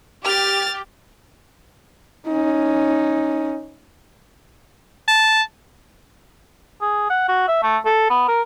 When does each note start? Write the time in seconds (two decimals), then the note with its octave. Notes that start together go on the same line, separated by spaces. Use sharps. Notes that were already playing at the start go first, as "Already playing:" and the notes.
0.24 G4 F6 A6
2.28 C#4 D#4
5.08 A5
6.81 G#4
7.10 F#5
7.28 F#4
7.48 E5
7.63 A3
7.85 A4
8.10 B3
8.28 A#4